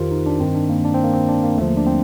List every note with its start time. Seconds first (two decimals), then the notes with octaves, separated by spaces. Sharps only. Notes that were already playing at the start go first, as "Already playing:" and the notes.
Already playing: F2 D#3 F4 G4 A#4 C5
0.11 D#4
0.26 D4
0.40 G2 D#3 C4
0.55 D4
0.69 A#3
0.84 D4
0.94 C4
1.04 A#3
1.14 C4
1.28 D4
1.43 A#3
1.57 D#2 D3 F3 A3
1.68 A#3
1.77 D4
1.86 C4